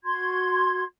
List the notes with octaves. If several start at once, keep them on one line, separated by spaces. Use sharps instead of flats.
F#4 C6 G#6